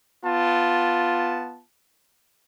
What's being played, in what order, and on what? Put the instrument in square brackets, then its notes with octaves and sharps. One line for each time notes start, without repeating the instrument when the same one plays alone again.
[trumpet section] B3 F4 A5